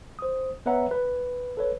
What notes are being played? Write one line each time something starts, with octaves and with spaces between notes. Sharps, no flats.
C5 D#6
B3 B4 C#5 E5 F#5 A#5
B4
A4 B4 C#5